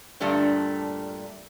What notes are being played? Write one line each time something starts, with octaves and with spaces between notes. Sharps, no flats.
G2 A#2 D3 G3 A3 D4